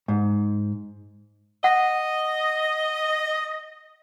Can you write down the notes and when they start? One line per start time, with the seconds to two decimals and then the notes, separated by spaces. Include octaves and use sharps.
0.08 G#2
1.64 D#5 F#5